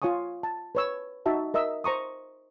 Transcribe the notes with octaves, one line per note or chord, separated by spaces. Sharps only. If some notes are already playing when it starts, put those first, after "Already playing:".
F4 C#5 G#5 C#6 D#6
A5
B4 C#5 E6
D#4 F#4 E5 A5
A#4 D#5 E5 E6
C5 A#5 C#6 D#6